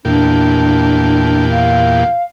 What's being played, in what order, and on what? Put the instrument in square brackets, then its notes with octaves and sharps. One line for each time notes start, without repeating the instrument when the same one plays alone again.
[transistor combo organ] E2 A#2 G4 [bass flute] D4
[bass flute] F5